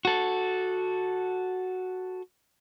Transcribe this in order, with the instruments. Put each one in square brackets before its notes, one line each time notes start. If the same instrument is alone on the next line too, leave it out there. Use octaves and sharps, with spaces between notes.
[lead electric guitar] F#4 A4